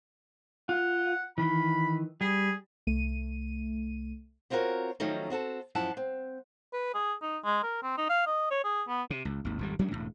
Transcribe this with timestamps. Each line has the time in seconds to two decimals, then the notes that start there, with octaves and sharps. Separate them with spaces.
0.69 F4 F#5
1.38 D#3 E3 B5
2.21 G3 G#4
2.87 C2 A3 D#7
4.50 B3 C4 F4 F#4 A#4 C#5
5.00 D#3 F3 F#3 A3 C#4 D#4
5.30 C4 F#4 A4 A5
5.75 F#2 F3 E4 E5 F#5 A5
5.97 C4
6.73 B4
6.94 G#4
7.22 D#4
7.44 G#3
7.63 A#4
7.83 C4
7.97 D#4
8.09 F5
8.26 D#5
8.51 C#5
8.64 G#4
8.88 B3
9.10 C3
9.25 C#2
9.45 G#1 D#2
9.59 G#1 F2 G3
9.79 F#3 G#3 C#4 D4
9.91 E1 F#2 A2